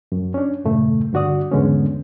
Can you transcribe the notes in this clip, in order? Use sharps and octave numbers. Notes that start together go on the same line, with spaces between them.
F#2
C#4 D4
E2 G2 A#2 C#3 A3
G2 D3 F#4 D5 D#6
E2 G#2 D3 G#3 B3 C#4